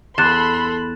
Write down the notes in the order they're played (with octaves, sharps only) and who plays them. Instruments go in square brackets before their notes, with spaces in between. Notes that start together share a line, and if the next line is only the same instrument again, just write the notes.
[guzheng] E2 [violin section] A4 B5 C6 [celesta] F#6 A6 E7